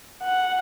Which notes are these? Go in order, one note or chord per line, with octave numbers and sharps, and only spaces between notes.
F#5